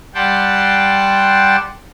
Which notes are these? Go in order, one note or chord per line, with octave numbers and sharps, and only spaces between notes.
G3 G4 F#5 G5 A5 C6